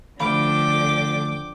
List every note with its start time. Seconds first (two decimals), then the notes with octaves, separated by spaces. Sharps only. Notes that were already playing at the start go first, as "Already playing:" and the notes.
0.20 D2 D3 F3 F5 G5 B5 D6